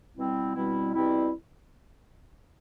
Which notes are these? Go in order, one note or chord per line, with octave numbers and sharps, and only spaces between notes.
B2 G3 C4 E4
B2 G3 C4 E4
B2 G3 C4 E4